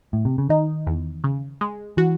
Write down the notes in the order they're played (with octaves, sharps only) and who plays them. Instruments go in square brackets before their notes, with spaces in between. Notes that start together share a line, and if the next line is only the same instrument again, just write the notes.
[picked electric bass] A2
C3
C#3
[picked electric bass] D#3 [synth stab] D#4
[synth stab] E2
C#3
G#3
[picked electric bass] E3 [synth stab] F#4